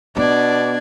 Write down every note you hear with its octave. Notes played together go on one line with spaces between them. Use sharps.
B2 B3 D4 D5 G#6